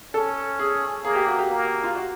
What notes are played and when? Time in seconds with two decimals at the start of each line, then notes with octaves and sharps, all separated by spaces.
0.14 C#4 A4
0.59 G#4
1.04 A#3 G#4
1.15 G4
1.27 F#4
1.39 G4
1.50 A#3
1.84 F4
1.95 F#4